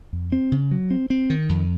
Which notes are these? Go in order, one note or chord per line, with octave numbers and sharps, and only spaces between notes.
F2
C4
C#3
F#3
C4
C4
D#3
F2